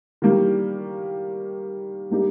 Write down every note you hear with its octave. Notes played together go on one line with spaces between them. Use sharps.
D#3 G3 A#3
G3 A#3 D#4 G4